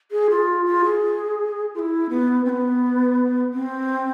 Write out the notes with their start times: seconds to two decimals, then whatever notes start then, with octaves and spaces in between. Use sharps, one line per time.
0.11 G#4
0.30 F4
0.66 F4
0.84 G#4
1.74 F4
1.79 E4
2.10 B3
2.45 C4
2.49 B3
3.53 C4